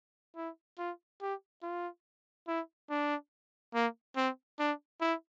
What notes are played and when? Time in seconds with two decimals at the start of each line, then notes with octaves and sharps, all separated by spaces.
0.36 E4
0.78 F4
1.22 G4
1.63 F4
2.48 E4
2.90 D4
3.74 A#3
4.16 C4
4.60 D4
5.01 E4